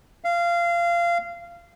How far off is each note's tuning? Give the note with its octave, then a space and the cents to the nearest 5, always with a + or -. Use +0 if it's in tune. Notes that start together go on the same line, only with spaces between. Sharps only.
F5 -20